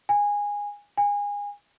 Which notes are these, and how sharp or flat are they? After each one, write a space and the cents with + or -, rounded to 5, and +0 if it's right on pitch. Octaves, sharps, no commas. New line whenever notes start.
G#5 -15
G#5 -25